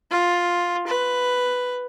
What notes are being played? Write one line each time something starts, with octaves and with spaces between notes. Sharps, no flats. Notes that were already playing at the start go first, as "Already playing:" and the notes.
F4
B4